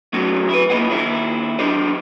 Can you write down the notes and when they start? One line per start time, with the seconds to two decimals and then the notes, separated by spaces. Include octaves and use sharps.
0.13 F#3 A3 C#4 F#4
0.49 E4 B4
0.70 A#3 E4 F4 C5 D#5 F#5
0.89 D#2 E4 C5 E5
1.59 F#3 D4 G4 C5 D#5